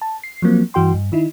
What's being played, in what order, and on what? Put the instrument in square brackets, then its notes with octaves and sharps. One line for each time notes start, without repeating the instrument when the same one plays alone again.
[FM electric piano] A5
C7
F3 F#3 A#3 C4
G2 E3 F#4 G5 C6
G2
D#3 D#4 E4